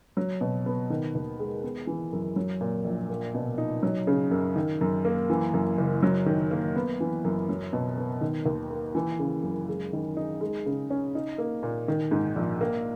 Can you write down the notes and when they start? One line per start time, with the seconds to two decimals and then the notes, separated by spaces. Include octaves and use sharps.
0.17 F#3
0.41 B2
0.66 B3
0.90 D#3
1.15 D#2
1.40 G#3
1.63 B3
1.87 E3
2.13 F#2
2.36 F#3
2.61 A#2
2.85 A#1
3.09 A#3
3.34 B2
3.58 D#4
3.83 F#3
4.07 C#3
4.31 F#2
4.56 D#3
4.81 F#2
5.05 A#3
5.30 E3
5.54 F#2
5.78 F#1
6.03 F#3
6.26 D#3
6.51 A#3
6.76 B3
7.00 E3
7.25 F#2
7.49 F#3
7.73 B2
7.98 B3
8.21 D#3
8.46 D#2
8.70 A#3
8.95 E3
9.19 C#3
9.43 F#2
9.69 G#3
9.93 D#3
10.17 D#4
10.41 G#3
10.66 C#3
10.90 C#4
11.15 D#4
11.38 A#3
11.63 A#2
11.88 D#3
12.11 G#2
12.36 A#1
12.61 A#3